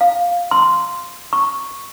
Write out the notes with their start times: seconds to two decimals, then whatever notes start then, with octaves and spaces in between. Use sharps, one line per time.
0.01 F5
0.51 C6
1.33 C#6